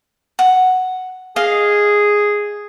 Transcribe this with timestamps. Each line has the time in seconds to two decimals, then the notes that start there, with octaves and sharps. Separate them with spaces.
0.39 F#5
1.36 G#4 D#5 F5